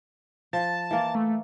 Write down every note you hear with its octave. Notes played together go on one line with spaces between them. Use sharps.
F3 A5
E3 A#3
A3